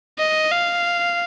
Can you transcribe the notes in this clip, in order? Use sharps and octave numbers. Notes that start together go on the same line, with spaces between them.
D#5
F5